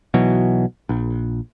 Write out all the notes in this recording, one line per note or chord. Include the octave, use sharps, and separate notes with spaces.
B1 B2 E3 F#3
A#1